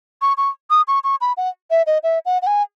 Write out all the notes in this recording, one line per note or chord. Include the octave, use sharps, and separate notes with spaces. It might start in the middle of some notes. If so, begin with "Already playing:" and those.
C#6
C#6
D#6
C#6
C#6
B5
F#5
E5
D#5
E5
F#5
F#5
G#5